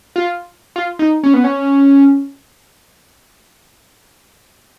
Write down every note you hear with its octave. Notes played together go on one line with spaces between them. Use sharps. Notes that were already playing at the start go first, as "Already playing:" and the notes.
F4
F4
D#4
C#4
B3
C#4